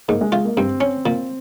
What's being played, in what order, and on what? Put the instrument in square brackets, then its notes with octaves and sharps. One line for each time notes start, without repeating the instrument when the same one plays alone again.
[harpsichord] G#2 [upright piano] A#3
[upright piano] G#3
[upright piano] G#3 [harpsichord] F4
[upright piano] A#3
[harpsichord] G2 [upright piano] C4
[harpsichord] C#4
A#2